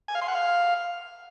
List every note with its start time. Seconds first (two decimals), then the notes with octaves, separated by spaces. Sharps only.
0.08 G#5
0.15 F5
0.22 C6
0.28 F#5
0.35 F5